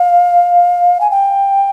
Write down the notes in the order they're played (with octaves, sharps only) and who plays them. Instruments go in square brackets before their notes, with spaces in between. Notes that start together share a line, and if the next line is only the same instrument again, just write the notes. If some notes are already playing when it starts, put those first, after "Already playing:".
Already playing: [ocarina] F5
G#5
G5